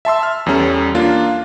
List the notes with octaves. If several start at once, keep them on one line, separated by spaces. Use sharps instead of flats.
E5 A5 C6 E6
F6
E2 G3 C#4 A4
A#3 D4 F4